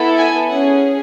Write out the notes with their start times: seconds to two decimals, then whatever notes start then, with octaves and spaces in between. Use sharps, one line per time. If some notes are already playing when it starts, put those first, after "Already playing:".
Already playing: B3 E4 A4
0.17 G#5
0.49 C#4 G#4 F#5